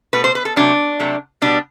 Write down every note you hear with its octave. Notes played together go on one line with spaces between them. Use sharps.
B2 A3 B4
C5
B4
A4
C3 F#3 A3 D4
C3 F#3 A3
B2 G3 B3 D4